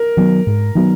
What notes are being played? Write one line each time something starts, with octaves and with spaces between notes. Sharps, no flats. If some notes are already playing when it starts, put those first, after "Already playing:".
Already playing: A#4
D#3 F#3 B3
G#2
D#3 F#3 B3